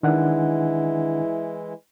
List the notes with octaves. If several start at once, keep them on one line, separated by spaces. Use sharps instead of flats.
D#3 E3 G#3 D4 E4 F#5